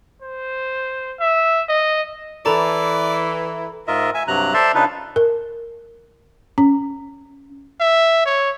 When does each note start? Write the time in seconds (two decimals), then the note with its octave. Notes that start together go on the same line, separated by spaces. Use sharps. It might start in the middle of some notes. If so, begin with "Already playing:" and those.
0.22 C5
1.20 E5
1.68 D#5
2.46 E3 A4 D5 A#5 B5
3.88 G#2 F4 A#4 D#5 E5
4.14 E5 G#5
4.28 G2 C3 F#3 A#5 F#6
4.54 A4 C5 D5 E5 A5 C6
4.75 C#3 D4 D#4 F4 B4
5.16 A#4
6.58 C#4
7.81 E5
8.26 C#5